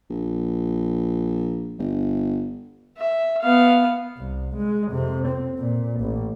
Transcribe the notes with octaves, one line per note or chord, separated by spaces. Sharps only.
A#1
G1
E5
B3 F5
C2
G#3
F2 C3
C4
A#2
A1